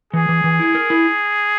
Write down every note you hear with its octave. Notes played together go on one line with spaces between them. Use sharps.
E3 G#4
E3
E3
E4
A#4
E4